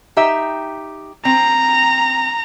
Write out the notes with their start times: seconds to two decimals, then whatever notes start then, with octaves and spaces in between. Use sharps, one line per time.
0.17 D#4 G4 E5
1.25 C4 A#5